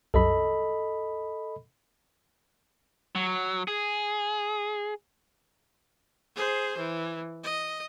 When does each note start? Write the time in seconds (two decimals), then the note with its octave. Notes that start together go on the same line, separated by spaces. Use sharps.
0.14 C2 F#2 A4 D#5 B5
3.15 F#3
3.68 G#4
6.36 G#4 C5
6.78 E3
7.44 D#5